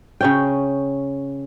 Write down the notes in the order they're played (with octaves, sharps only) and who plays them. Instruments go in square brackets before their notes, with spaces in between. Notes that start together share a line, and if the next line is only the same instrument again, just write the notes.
[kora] C#3 C#4 G5